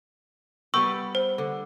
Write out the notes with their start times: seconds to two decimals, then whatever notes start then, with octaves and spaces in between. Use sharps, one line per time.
0.74 G3 B3 G5 C#6 E6
1.15 C5
1.38 D3